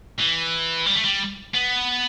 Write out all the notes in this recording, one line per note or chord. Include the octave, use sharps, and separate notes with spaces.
E3
G3
A3
G3
B3